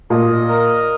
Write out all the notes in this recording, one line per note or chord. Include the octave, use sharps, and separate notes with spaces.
A#2 D#5
A#4